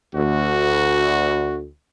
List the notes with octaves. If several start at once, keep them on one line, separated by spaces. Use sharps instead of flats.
D2 F#4